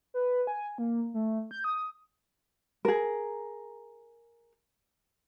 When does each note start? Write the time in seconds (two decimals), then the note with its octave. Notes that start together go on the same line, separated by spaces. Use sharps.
0.14 B4
0.47 G#5
0.78 A#3
1.14 A3
1.51 G6
1.64 D#6
2.85 G#4 A#4